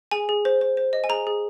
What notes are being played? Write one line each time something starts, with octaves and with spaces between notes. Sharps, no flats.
G#4 G#5
G#4
C5
C5
C5
D#5
G#5
G#4 A#5
G#4